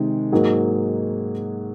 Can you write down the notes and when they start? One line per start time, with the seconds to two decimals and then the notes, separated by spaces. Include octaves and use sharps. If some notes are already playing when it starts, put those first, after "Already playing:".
Already playing: C3 D#3 G#3
0.32 G#2 F#3 A#3 D#4 G#4